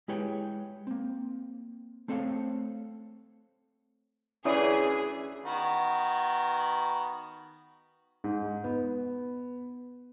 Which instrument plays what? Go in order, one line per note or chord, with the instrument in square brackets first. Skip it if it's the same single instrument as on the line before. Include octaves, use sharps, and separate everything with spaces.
[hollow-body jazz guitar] G#3 E4 G4 B4 C#5 G5
A#3 C4
A3 C4 A4 C5 C#5 F5
[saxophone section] D2 E3 [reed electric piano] C#4 E4 C#5 [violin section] G#4 [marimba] D5 D#6
[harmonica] D#3 B3 F#4
[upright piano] G#2
B3